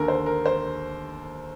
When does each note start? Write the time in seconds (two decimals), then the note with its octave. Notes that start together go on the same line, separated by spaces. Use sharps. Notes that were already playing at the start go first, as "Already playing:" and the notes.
Already playing: D#2 D3 A#4
0.08 C5
0.26 A#4
0.46 C5